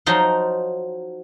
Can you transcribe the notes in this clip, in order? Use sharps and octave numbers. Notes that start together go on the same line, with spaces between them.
F3 F#3 D#4 F4